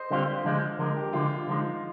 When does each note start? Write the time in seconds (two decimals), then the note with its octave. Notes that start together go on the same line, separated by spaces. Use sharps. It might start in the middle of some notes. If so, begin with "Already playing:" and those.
Already playing: C5 D#5
0.11 D3 G3 C4 F4
0.44 D3 F3 G#3
0.79 D3 F3 G#3 A#4
0.96 G4
1.13 D3 F3 G#3 F4
1.47 D3 F3 G#3 D#4